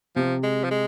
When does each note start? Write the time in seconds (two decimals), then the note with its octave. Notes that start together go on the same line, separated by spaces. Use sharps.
0.16 C3 F3
0.43 G#3
0.64 F3
0.71 G#3